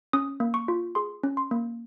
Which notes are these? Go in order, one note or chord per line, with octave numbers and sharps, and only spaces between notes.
C#4 D#6
A#3
C#6
F4
G#4 C6
C#4
C6
A#3